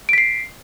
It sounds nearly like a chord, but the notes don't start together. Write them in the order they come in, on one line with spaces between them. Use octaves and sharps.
D7 B6 C7